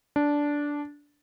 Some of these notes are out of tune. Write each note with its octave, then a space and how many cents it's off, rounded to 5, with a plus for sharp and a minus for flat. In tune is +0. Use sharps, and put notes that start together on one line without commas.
D4 -10